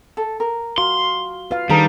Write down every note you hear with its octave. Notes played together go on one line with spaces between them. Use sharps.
A4
A#4
F#4 F5 C6
F4 B4 F5
D#3 G3 D4 G#4 B4 A#5